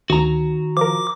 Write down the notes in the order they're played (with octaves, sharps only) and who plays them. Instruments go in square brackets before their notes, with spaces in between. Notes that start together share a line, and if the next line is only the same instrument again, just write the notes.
[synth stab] D2 [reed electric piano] D#3 [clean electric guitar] F#4 A#5
[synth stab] F3 A#4 [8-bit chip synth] D6